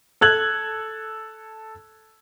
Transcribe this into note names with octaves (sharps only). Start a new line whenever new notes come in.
A4 F#6 G#6 F#7